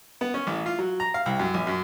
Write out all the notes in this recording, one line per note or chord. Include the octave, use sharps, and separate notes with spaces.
B3
C#4
A1
F4
F#3
A#5
F5
C2
F#2
A#1
F#2